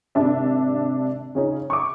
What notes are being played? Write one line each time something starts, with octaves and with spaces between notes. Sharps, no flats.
G#1 C3 D4 D5 E5
C#3 C#4 D#4
C#6 D6